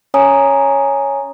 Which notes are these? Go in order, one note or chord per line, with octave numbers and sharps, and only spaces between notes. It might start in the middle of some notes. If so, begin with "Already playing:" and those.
C#4 C#5 G#5 A#5 D#6